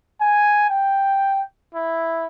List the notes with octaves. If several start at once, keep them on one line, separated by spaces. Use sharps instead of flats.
G#5
G5
E4